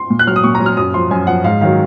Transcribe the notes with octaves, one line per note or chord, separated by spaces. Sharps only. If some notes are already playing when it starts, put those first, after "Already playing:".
Already playing: C6
A#2
F#6
F#3 F6
D#6
A#2 C#6
A#5
F#3
F6
F#2 D#6
F3 C6
F#2 G#5
F3 F#5
G#2 F5
D#3 F#3 F5